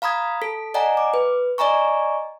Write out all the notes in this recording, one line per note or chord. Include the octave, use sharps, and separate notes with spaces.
F5 A#5 B5 D#6 G#6
A4 B6
D5 D#5 F#5 G#5 A#5
D6
B4
D5 D#5 G#5 A#5 C#6